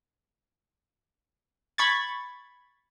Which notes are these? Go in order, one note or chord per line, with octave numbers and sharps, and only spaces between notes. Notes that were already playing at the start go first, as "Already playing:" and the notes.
B5 C#6 G#6 A6